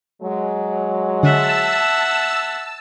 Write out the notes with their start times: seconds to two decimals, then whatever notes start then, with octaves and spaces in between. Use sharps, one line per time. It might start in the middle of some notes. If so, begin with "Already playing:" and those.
0.23 F#3 G#3
1.23 D3 E5 F#5 A5 E6